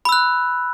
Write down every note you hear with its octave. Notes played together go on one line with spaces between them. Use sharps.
B5 E6 F#6